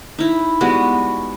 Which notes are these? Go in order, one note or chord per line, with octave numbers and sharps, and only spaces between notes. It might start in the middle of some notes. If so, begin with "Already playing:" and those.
D#4 E4
G3 G#3 B3 F#4